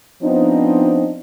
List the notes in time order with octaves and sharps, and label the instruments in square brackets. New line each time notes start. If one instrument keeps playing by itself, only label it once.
[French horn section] F3 B3 C4 D4 D#4